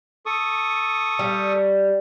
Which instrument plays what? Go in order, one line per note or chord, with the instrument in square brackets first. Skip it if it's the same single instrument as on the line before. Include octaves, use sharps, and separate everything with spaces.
[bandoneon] A4 C#6 D#6
[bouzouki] G3